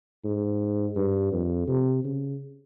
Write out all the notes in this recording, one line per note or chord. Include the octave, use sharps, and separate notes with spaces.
G#2
G2
F2
C3
C#3